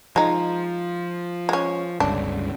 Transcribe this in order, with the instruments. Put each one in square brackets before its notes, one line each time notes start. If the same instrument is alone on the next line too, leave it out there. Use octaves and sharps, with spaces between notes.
[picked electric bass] F3 [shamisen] G#3 D#4
[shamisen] G#3 C#4
[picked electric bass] G1 C#2 C#3 [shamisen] D4